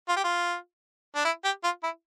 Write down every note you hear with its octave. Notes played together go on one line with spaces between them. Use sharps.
F4
G4
F4
D4
E4
G4
F4
E4